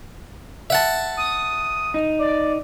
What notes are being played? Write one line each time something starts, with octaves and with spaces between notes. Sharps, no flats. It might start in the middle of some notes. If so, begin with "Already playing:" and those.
E5 F#5 A5
D#6
D#4
D5